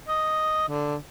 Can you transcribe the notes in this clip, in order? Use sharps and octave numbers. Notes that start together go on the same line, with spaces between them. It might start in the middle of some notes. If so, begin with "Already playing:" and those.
D#5
D3